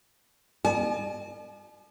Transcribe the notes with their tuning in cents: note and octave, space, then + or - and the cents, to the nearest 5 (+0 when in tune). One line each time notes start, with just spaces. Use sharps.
D5 +45 A5 -40